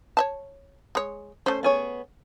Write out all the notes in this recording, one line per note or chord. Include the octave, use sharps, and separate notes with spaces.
C#5 E5 A5
G#3 C#5
A3 C#4 C5
B3 G#4 C#5